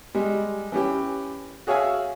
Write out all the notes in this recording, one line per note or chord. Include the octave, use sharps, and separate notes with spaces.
G3 G#3
E3 C#4 G4
F#4 G#4 C#5 E5 F5 G#5